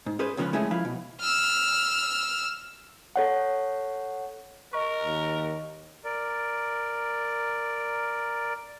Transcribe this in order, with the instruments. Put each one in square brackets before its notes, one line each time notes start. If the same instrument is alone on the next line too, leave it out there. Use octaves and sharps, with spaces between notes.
[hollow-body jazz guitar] G#2
C#4 G#4 B4 C5
C#2 C#3 F3 A#3 C#4 B4
G#3 A3 C#4 E4 G#4
F3 E4 F5 B5
B2
[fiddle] E6 F6
[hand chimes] A4 C#5 F#5
[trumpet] A#4 [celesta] D#5 C#6
[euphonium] D#2
[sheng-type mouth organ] A#4 D5